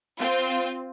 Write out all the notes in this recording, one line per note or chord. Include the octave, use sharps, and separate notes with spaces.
C4 F4